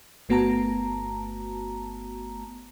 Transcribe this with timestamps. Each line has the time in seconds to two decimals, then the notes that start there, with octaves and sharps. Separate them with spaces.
0.29 G1 A3 B3 F#4 A5 A#5